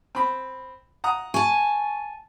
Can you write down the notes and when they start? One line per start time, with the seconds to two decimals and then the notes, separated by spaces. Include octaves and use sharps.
0.15 C4 B5
1.04 F#5 A#5 D#6
1.34 G#5 A5 C#6